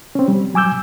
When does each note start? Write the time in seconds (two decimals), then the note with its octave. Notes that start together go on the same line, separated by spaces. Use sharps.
0.15 C4 C#4
0.28 G3
0.54 F#3 G#5 D6 E6 G6